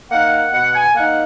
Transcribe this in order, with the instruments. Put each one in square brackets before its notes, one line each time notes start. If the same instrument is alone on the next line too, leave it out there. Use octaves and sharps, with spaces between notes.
[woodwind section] A#3 D#4 F#5
F#5
B2 F#5
G#5
A#3 D#4 F#5